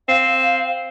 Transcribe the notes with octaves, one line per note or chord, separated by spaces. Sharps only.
C4 F5